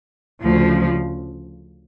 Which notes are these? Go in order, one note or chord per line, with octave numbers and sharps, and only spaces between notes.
D2 C#3 F3